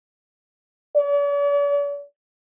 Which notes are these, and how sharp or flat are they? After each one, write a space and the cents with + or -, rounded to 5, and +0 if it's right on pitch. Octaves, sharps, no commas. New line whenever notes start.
D5 -45